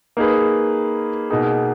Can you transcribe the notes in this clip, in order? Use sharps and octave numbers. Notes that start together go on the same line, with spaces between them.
A#3 D#4 G#4 B4
B2 A#3 D#4 G#4